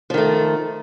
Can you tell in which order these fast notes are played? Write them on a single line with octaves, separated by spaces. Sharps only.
F3 D#3 A3